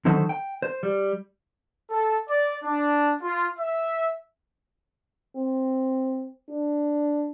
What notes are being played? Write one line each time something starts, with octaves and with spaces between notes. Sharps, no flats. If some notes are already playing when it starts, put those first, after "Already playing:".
D3 D#3 F#3 A3 D#4 C5
G5
C5
G3
A4
D5
D4
F4
E5
C4
D4